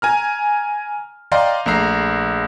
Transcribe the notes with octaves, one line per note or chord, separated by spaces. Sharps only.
G#5 A#5 F6
D5 D#5 F5 G5 A#5 C6
A#1 A3 A#5 C7